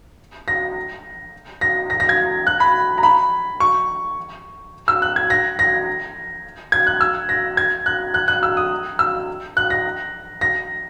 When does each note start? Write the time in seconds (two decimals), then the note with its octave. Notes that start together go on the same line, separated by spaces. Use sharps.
0.48 A#6
1.61 A#6
1.90 A#6
2.00 A#6
2.09 G#6
2.47 F#6
2.60 B5
2.98 A#5
3.03 B5
3.60 C#6
4.88 E6
5.02 F#6
5.16 G#6
5.30 A#6
5.59 A#6
6.72 G#6
6.87 F#6
7.01 E6
7.29 A#6
7.57 G#6
7.86 F#6
8.14 F#6
8.28 F#6
8.43 E6
8.57 D#6
8.99 E6
9.57 F#6
9.70 A#6
10.41 A#6